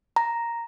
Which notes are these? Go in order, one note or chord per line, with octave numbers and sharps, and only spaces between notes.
A#5